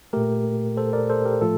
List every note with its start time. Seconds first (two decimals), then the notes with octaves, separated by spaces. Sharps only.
0.13 A#2 A3 G4 A#4
0.77 A4 C5
0.93 A#4 D5
1.10 A4 C5
1.25 G4 A#4
1.41 A2 F3 A3 F4 A4